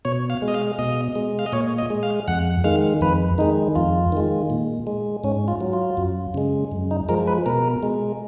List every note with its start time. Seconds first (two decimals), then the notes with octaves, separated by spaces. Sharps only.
0.05 B2 C#5
0.30 F5
0.42 G#3
0.48 D#5
0.54 F5
0.79 B2 D#5
1.15 G#3
1.39 F5
1.46 D#5
1.53 A#2 C#5
1.78 D#5
1.90 G#3
2.03 F5
2.28 F2 F#5
2.64 D#3 G#3 F5
3.01 F2 B4
3.38 D#3 G#3 D#4
3.75 F2 F4
4.12 D#3 G#3
4.50 A#2
4.87 G#3
5.24 G#2 C#4
5.48 F4
5.61 F#3
5.73 F4
5.97 F#2
6.34 C#3 G#3
6.72 F#2
6.91 D#4
7.09 F3 G#3 A#4
7.27 B4
7.46 B2 A#4
7.83 G#3